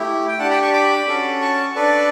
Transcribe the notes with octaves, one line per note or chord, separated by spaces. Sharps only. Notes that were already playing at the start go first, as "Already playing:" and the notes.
Already playing: A3 E4 G4
G5
D4 F#5 A5
G4
G5 B5
A5 C#6
B5 D6
C#4 F#4 A4
A5 C#6
D4 A4 B4 D5